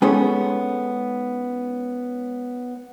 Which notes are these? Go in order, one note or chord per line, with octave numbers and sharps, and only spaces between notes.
G#3 B3 C#4 D#4 A4